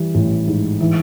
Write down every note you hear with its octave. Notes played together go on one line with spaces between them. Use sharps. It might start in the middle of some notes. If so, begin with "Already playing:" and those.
Already playing: E3 G3
A1
G#2
E3